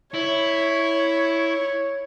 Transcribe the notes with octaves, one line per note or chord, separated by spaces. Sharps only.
E4 C#5